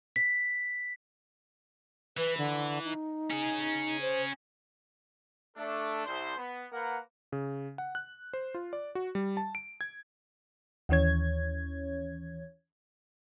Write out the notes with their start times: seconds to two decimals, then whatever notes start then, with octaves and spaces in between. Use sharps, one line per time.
0.16 B6
2.17 E3 B4
2.38 D3
2.85 D#4
3.31 C#4 G#4
4.01 C5
5.57 A3 D4 A4
6.05 C2 C5
6.37 B3
6.72 A#3 A#4 B4 F#5
7.32 C#3
7.78 F#5
7.95 F#6
8.33 C5
8.54 F4
8.73 D5
8.95 F#4
9.15 G3
9.37 A5
9.55 D7
9.81 G#6
10.89 D#2 E3 C#4 C#5 G#6